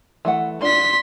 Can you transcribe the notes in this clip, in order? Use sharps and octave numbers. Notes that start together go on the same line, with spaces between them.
E3 A3 F#5
D4 F4 C6 B6